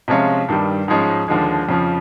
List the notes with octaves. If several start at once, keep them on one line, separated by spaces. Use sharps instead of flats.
C3 F3 G#3 C#4 F4
G2 D#3 G3
G#2 F3 G#3 C#4
D#2 D3 F3 G#3
F2 C#3 F3